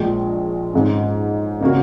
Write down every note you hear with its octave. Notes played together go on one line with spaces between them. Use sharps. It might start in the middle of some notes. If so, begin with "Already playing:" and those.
Already playing: A#1 A#2 G#3
G#2 G#3 C#4
C#3 A#3 C#4 F#4